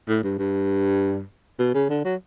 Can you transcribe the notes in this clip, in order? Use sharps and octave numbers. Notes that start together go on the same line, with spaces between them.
A2
G2
G2
B2
C#3
D3
F#3